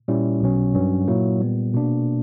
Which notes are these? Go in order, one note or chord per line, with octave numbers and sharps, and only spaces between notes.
A#2 G3 C#4 E4
B1 B2 F#3 C#4
G2 F#3 C#4
A#2 F#3 A#3 E4
A#2 G3 B3
B2 A#3 D4